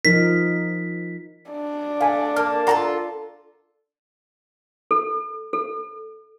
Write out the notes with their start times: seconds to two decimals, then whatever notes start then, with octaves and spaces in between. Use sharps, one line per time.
0.05 F3 D#4 A#4 B6
1.51 D4
2.01 A3 F5 G#5
2.36 A#3 A5 F6
2.67 F4 F#4 A4 A#4 F#5 A#5
4.91 A4
5.53 A4